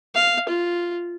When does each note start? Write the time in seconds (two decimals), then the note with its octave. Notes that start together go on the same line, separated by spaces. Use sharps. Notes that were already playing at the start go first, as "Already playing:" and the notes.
0.15 F5
0.48 F4